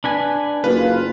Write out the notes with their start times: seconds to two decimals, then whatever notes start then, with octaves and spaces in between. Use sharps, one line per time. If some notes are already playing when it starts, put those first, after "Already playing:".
0.04 D4 B4 G#5
0.64 F#1 F4 B4